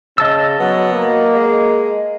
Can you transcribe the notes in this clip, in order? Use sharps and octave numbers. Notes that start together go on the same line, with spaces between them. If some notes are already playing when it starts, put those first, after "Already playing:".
C#3 C#4 D#5 A5 E6
F#3 B3
A#3
G#3